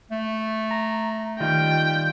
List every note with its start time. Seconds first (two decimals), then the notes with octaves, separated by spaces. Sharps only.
0.11 A3
0.71 A#5
1.40 D#3 G3 F4 G5